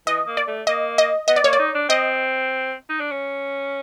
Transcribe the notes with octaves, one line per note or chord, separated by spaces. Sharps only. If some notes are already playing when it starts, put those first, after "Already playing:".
E3 D#5
A#3
D5
A3
A#3 D#5
D#5
B3 D#5
D5
A#3 C#5
D5
D#4
D4
C4 D#5
D#4
D4
C#4